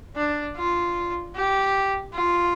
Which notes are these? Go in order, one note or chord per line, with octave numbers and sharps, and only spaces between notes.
D4
F4
G4
F4